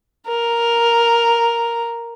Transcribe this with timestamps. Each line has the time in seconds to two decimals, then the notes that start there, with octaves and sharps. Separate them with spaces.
0.28 A#4